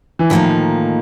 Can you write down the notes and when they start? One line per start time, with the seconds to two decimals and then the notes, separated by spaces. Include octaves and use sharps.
0.19 E3
0.30 A2 D#3 F3 A#3 D#4